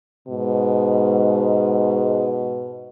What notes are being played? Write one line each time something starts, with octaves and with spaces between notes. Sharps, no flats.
G#2 B2